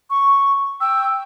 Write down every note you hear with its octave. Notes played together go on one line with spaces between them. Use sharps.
C#6
G5 E6